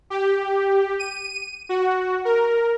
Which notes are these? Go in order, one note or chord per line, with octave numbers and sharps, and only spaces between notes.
G4
D#7
F#4
A#4